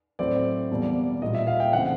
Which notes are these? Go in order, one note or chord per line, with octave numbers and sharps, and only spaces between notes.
A2 F#3 A3 C4 D5
E2 B2 G3 A#3
A#2 G3 A#3 D#5
E5
F5
G5
C#3 E3 A3 C4 F#5